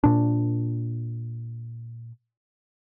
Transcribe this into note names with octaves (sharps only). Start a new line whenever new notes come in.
A#2 D4